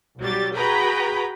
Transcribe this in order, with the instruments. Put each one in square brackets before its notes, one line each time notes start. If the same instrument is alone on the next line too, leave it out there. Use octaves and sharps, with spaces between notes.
[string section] B1 F#3 G3 G4 A6
F#4 G#4 B4 G5 A#5 B5